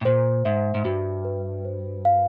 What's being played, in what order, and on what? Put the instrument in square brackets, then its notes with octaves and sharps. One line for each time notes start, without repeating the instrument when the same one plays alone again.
[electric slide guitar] A2
[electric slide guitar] A#2 [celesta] C5
[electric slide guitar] G#2 [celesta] E5
[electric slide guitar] G#2
[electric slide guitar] G2 [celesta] F#4
[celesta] B4
C5
F5